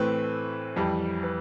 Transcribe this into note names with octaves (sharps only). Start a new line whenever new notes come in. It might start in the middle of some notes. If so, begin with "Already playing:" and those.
Already playing: A2 E3 A3 C4 B4
F2 E3 G3
B4